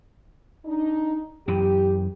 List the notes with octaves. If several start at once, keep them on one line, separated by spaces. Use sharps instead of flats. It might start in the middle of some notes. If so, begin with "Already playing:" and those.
D4 D#4
F#2 E3 G4